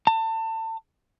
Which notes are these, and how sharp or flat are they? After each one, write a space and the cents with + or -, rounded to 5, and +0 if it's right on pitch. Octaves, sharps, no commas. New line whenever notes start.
A5 +30